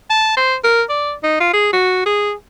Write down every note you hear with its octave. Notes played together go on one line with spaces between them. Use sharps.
A5
C5
A#4
D5
D#4
F4
G#4
F#4
G#4